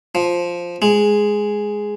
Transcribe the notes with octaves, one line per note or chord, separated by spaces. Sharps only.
F3
G#3